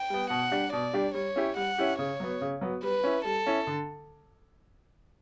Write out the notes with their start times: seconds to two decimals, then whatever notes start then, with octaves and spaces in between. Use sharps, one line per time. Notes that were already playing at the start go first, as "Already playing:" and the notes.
Already playing: G5
0.10 G3 B3
0.30 B2 F#5
0.51 G3 D4 G4
0.72 B2 D5
0.93 G3 D4 G4
1.14 G3 C#5
1.36 C#4 E4 G4
1.56 G3 F#5
1.78 C#4 E4 G4
1.98 C#3 C#5
2.20 F#3 B3
2.41 C#3
2.61 F#3 B3
2.83 G3 B4
3.04 C#4 E4
3.25 G3 A4
3.47 C#4 E4
3.67 D3